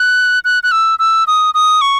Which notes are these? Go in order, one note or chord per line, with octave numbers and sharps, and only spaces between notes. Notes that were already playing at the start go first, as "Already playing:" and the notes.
Already playing: F#6
F#6
F#6
E6
E6
D#6
D#6
C#6